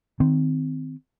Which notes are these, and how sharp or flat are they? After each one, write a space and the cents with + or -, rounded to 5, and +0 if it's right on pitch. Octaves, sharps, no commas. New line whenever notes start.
D#3 +0 C4 -20